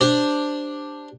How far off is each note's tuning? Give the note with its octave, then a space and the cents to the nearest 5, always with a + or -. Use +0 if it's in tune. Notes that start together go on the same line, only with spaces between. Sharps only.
D4 +0 G4 +0 C5 +0